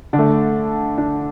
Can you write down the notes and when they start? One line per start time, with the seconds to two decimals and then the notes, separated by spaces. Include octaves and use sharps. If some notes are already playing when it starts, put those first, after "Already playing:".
0.13 D3 D4
0.19 A3
0.98 D4